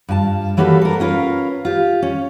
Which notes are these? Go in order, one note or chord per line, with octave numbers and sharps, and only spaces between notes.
G2 F4 G#5 A5
E3 F#3 A#3 G4 A4 B4
A4 A#4
C#4 F4 A#4 B4
F4 G4
C#4